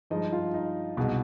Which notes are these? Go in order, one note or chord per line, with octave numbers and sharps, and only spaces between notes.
G2 F3 G#3 D#4 D#5
F4
D#4
C2 B2 G#3